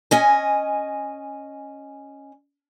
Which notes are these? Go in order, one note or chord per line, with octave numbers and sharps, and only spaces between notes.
C#4 D#5 G#5